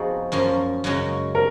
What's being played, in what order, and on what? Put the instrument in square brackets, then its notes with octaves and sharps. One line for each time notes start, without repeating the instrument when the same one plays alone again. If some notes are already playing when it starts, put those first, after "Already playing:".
Already playing: [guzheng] F2 F3 B3 D#4 F#4 [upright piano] G#4
[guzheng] F#2 F3 A#3 C#4
F#2 C#3 G#3 C#4 F#4
[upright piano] A#4